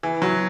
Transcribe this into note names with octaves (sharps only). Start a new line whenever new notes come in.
E3
F#3